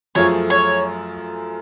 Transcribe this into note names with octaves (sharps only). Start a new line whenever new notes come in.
F#2 F3 A3 F4 G#4 C#5
C#5